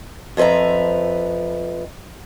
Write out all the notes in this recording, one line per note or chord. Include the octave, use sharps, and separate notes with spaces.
F2 F3 B4 E5 A#5